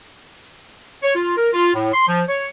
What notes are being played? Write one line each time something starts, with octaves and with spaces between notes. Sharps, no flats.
C#5
F4
A#4
F4
A2
C6
F3
C#5